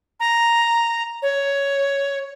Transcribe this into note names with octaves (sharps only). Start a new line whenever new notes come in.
A#5
C#5